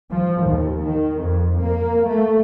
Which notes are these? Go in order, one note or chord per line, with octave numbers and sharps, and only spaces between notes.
F3
D#2
D#3
F2
A#3
A3